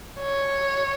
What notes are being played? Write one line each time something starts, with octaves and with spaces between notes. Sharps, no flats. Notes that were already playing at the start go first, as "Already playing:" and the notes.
C#5